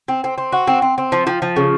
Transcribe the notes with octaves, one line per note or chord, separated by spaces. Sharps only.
C4
C4
C4
F#4
C4
C4
C4
F3
F3
F3
C#3